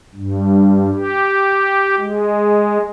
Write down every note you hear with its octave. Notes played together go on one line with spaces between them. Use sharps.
G2
G4
G#3